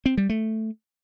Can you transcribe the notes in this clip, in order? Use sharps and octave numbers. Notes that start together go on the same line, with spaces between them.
C4
G3
A3